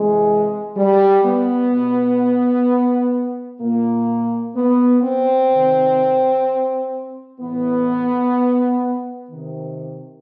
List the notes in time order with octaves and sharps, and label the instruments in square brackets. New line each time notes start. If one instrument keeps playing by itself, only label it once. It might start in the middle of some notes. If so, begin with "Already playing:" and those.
Already playing: [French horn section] C3 E3 G#3
G3
B3
B2
A#2 A#3
B3
C4
C3 D#3
A2 E3 B3
C3 D#3